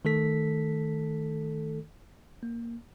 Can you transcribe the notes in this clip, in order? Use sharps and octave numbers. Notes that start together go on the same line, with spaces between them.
D#3 A3 A4 B6
A#3